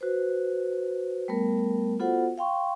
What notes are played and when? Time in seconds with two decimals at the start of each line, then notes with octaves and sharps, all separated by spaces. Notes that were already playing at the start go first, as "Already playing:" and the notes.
0.01 F#4 B4 C5
1.28 G3 A3 B3 A#4
1.99 B3 F4 F#4 A4 C5 F#5
2.38 F5 G5 C6 C#6